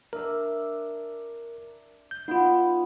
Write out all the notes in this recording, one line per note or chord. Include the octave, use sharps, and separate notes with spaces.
D4 A#4 E5
G6
B3 D#4 F4